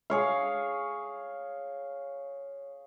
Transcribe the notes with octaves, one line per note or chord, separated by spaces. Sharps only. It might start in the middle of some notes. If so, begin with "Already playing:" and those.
G#4 C#5 F5